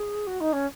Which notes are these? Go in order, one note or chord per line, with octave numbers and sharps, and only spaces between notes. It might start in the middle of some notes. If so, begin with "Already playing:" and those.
Already playing: G#4
F#4
D#4
C#4